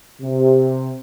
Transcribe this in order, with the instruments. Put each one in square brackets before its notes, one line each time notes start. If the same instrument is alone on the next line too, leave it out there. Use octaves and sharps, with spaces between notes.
[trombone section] C3